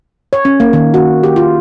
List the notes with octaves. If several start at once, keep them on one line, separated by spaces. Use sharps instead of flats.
C#5
C#4
A#3
D#3
F#4
G4
F4